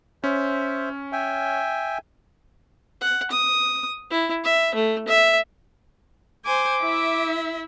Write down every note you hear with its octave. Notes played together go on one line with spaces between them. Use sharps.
C#4 C5 E5
E5 G5 G#5
F#5
D#6
E4
E5
A3
E5
C5 G#5 D6
E4 E5